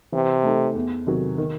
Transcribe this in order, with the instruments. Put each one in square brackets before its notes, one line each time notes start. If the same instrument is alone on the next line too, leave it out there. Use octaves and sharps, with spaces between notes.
[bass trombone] C3 [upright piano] E3
[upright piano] A3 D#4 A4
E2
C3 D#3 F#3
D#3